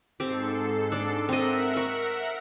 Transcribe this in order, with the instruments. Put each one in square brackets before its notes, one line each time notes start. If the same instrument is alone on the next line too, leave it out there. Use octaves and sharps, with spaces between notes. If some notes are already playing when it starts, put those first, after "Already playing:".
[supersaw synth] G#2 A4 C7 [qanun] C4 G4
[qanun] D4 D5
[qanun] C4 D#5 [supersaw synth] A#4 E5 F#5
[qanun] C#6